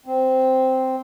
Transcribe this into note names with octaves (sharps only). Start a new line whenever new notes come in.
C4